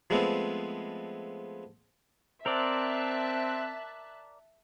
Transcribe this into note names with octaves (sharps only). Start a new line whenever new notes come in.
F3 G#3 A3 B3 C4
C4 A#4 D5 E5 A5 F#6